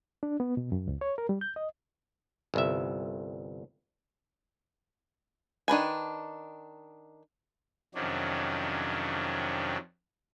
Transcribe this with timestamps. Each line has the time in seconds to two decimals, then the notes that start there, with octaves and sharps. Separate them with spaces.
0.23 D4
0.40 B3
0.57 B2
0.72 F#2
0.88 C#2
1.01 C#5
1.18 A#4
1.29 G3
1.41 G6
1.56 D#5
2.54 G1 C2 E5
5.68 D#3 D4 B4 G#5
7.95 F2 C3 D#3 F#3 C#4 D4